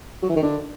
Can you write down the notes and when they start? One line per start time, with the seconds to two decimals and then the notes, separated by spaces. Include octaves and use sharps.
0.23 F#3
0.29 E3
0.36 D#3
0.43 D3